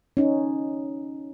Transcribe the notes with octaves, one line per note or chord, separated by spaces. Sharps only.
C#4 D#4